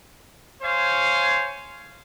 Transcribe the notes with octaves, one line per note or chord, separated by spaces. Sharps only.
C5 C#5 F5 G#5